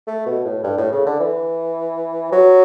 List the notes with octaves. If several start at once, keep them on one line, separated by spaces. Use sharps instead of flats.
A3
B2
A2
G2
A2
C#3
D3
E3
F#3